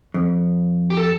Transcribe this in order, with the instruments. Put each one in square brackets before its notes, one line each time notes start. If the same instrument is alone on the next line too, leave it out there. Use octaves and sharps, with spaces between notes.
[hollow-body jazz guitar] F2
[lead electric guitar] G4
A4